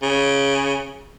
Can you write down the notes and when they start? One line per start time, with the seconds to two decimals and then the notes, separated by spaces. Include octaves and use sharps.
0.03 C#3